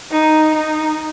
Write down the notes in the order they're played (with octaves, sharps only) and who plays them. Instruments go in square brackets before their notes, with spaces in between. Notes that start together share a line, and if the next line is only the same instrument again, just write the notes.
[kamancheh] D#4
D#4